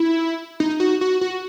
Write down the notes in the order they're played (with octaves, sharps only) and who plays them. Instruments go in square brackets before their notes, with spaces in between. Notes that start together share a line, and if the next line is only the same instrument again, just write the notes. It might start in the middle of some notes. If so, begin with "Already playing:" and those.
Already playing: [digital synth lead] E4
D#4
F#4
F#4
F#4